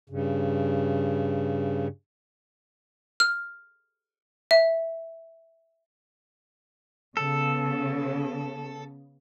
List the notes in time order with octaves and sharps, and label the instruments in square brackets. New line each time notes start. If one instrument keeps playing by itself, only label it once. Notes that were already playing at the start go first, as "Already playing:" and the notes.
[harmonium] G2 C#3
[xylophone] F6
E5
[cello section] C#3 B3 [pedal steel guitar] A4